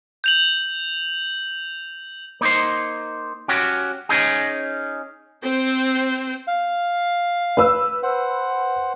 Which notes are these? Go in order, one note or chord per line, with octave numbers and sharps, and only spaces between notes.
G6 F7 F#7
A#3 D#4 C5
C#4 F#4 G4
C#4 D#4 G#4
C4 C5
F5
B4 E6
C5 F#5